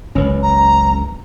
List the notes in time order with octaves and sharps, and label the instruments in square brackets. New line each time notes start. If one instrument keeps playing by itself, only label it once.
[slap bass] F#1 C#2 [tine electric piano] C#4 B4
[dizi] A#5